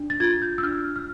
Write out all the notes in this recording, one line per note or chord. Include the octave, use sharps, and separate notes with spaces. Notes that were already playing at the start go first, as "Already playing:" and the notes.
Already playing: D4
A6
F4 G#6
G6
E6
D4 F6
F6